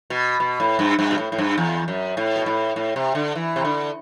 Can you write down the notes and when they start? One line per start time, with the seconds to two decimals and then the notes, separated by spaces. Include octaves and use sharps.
0.10 B2
0.40 B2
0.60 A2
0.79 G2
0.99 G2
1.11 B2
1.18 A2
1.32 A2
1.38 G2
1.58 E2
1.88 F#2
2.17 A2
2.36 B2
2.46 A2
2.76 A2
2.96 C3
3.15 D3
3.35 E3
3.56 C3
3.65 D3